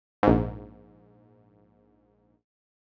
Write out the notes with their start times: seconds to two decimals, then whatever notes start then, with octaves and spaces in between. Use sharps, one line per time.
0.23 A#1 G#2